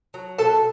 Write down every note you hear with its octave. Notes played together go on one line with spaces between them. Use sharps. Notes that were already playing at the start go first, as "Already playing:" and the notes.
F#3
B2 A4 A5